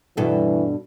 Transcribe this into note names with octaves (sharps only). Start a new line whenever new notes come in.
G2 B2 E3 A4